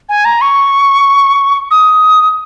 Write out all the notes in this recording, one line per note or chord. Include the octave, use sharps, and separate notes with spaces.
G#5
A#5
C#6
D#6